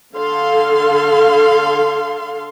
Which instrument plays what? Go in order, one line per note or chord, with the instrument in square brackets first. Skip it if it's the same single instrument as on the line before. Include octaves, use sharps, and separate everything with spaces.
[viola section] D3 A4 F5 C6